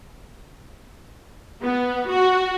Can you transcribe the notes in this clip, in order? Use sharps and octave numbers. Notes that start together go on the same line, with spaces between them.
B3
F#4